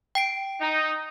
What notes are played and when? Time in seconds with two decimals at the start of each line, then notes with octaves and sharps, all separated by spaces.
0.15 G5 C7 D7
0.61 D#4